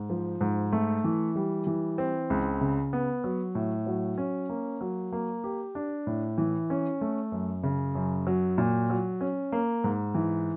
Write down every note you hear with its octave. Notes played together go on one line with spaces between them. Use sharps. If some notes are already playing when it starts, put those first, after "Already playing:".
Already playing: G#2
F3
G#2
A3
E3
G3
E3
C4
C#2
C#3
B3
F#3
A2
F#3
C#4
A#3
F#3
A#3
G4
D4
A2
E3
C#4
A3
F#2
C#3
F#2
F#3
A#2
F#3
C#4
A#3
G#2
E3